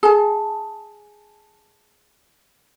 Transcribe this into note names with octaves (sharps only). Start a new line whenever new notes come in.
G#4 A5